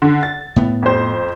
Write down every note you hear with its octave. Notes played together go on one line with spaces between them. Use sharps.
D3
A6
A2 B3
F2 C5